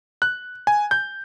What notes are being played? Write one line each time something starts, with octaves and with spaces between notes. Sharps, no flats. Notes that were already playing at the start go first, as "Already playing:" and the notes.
F#6
G#5
G6